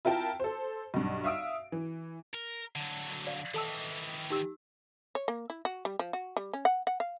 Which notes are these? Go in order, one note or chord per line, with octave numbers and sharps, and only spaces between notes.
E4 F4 A#4 G5 A5
A4 C5
B1 G2
E5 F5 D#6 E6 D7
E3
A#4
D3 F#3
D5 F5
D#3 E3 A4 A5 E6
D#4 G4 E6
C#5
A#3
E4
F#4
G3
F3
F#4
G3
C#4
F#5
F#5
F5